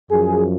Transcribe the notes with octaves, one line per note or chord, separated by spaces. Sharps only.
F#2 F3 G#4